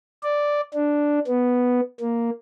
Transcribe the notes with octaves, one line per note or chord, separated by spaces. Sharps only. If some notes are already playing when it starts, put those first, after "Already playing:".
D5
D4
B3
A#3